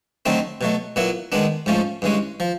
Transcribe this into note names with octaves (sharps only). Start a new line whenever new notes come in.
D3 F#3 A3 C4 D#4
B2 F#3 A3
A#2 F#3 B3 E4
D#3 G#3 B3 D4
G#2 F3 A3 C#4
G2 E3 G#3 C#4
F3